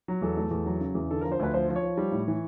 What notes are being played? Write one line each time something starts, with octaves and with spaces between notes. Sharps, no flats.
F#3
E2 A4
A3
E2
F#3
C#3
E2
D3 A4
A#4
F3
C5
D2 B4
F3 C5
F3
C#5
F3
G3
A2
E3